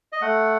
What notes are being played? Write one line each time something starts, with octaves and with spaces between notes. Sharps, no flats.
D#5
A3 F#5